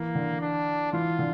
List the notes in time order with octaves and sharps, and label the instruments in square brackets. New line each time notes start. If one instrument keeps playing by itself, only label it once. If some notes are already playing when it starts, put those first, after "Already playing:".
Already playing: [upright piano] E3 [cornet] A#3
[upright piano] D3
[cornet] D4
[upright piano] E3 [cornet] F4
[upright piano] D3